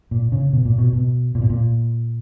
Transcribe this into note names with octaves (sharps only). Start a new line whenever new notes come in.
A#2
C#3
B2
A#2
B2
B2
A#2
B2
A#2